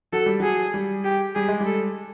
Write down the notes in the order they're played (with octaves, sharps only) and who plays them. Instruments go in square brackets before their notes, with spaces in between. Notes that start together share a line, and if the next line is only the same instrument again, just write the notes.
[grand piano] F#3 [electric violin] A4
[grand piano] G3
[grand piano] F#3 [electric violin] G#4
[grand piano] G3
[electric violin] G4
[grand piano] G3 [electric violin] G#4
[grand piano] G#3
G3
[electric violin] A4